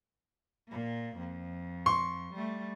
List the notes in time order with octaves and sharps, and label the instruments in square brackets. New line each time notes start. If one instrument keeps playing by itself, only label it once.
[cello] A#2 A#3
F2
[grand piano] C6 C#6
[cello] G3 A3